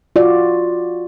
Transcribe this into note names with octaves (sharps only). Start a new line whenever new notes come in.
F4 F#4 D5